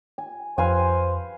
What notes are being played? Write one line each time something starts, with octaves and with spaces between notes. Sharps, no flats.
G#5
F2 B4 C5 F5 G#5